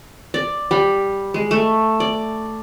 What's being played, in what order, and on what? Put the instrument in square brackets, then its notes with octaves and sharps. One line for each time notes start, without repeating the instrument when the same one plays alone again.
[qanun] D5
G3
G#3
A3
D5